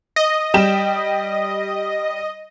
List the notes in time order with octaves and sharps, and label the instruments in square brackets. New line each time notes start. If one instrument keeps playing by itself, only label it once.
[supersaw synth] D#5
[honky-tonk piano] G3 G5 E7